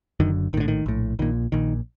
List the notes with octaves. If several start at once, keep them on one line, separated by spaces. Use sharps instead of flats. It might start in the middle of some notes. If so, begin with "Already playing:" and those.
F#1 F#2 D3 D#3
A#1 A2 D3 D#3
D#3
A#1 A2
A#1 A#2 D#3
A#1 A#2 D#3